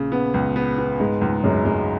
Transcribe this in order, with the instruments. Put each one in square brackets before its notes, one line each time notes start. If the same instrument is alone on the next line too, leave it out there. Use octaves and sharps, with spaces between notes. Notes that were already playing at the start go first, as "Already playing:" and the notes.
Already playing: [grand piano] A#1 A#2 [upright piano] C#3
[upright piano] B3
C#2
B3
B3
[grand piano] G#2 [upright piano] G#3
[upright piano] C#2 [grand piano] G#2
[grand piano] F#2 [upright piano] G#3
[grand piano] F#2 [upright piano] G#3